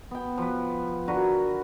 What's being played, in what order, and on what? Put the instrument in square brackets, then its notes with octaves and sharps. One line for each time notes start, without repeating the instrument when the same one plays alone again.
[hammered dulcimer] B3 G5
F3 B4
D3 F#4 A#4 B4